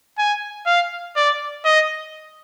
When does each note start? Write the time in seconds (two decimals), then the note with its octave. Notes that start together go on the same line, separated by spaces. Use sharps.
0.18 G#5
0.67 F5
1.16 D5
1.65 D#5